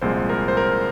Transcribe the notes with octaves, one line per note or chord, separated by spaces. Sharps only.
C2 A#2 F3 G#3 C5
A#4
C5
A#4